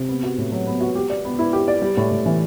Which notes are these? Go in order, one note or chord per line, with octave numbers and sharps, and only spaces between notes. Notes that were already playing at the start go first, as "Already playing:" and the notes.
Already playing: C3
B3
F#4
A2
F#3
B3
F#4
G4
D5
B3
E4
G4
D5
G3
A2
A2
E3